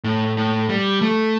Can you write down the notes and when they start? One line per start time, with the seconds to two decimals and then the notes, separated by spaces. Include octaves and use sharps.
0.04 A2
0.37 A2
0.69 G3
1.01 A3